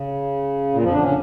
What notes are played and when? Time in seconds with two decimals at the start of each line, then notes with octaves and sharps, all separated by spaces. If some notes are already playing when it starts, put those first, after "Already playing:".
Already playing: C#3
0.74 A#2
0.83 F2 F3
0.93 D3 D4
1.03 C#3 C#4